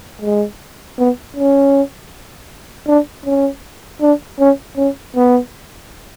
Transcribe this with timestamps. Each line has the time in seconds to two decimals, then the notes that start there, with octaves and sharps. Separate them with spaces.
0.22 G#3
0.98 B3
1.36 C#4
2.87 D4
3.26 C#4
4.01 D4
4.39 C#4
4.77 C#4
5.16 B3